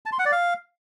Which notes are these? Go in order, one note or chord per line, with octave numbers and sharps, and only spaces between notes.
A5
C6
F#5
D5
F5